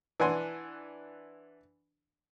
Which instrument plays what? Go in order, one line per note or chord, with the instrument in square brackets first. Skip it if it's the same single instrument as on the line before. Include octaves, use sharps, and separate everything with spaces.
[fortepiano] E3 D4 F#5 G#5 C6